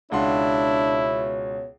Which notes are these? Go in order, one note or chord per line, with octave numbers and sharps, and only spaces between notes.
C#2 B2 D4 E4 C#5 F#5 C6